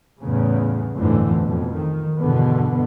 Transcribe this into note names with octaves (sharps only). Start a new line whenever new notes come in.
E2 A2 C#3
G1 F2 A2 D3 E3
F2 B2
D#3
E2 G2 B2 D3 B3